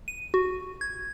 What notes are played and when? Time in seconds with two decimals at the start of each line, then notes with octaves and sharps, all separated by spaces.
0.08 D#7
0.34 F#4
0.81 G#6